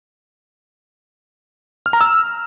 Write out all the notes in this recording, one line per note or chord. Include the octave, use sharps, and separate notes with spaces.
F6
A#5
E6